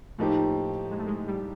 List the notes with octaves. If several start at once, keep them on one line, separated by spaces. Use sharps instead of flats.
A2 F3 A3 A#3 D#4 G4
G#3
A3
G#3
G3